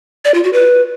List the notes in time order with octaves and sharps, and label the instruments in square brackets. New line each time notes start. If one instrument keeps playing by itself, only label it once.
[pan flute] D5
F4
F#4
B4